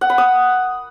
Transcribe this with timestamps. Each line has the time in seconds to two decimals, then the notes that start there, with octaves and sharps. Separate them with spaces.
0.01 F#5
0.10 B5
0.18 D#6